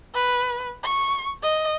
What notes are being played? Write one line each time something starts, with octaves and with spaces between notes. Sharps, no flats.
B4
C#6
D#5